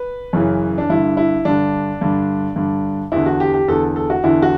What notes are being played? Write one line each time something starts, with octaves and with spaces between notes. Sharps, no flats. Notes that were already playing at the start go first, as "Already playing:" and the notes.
Already playing: B4
F#2 C#3 E3
D4
G2 D3 E4
E4
G2 D3 D4
G2 D3
G2 D3
E2 D3 E4
F#4
G4
G4
E2 D3 A4
A4
F#4
E2 D3 E4
F#4